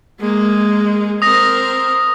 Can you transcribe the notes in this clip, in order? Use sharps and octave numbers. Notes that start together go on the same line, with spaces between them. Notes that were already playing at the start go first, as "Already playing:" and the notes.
G#3 A#3
C4 A#4 D#6 A#6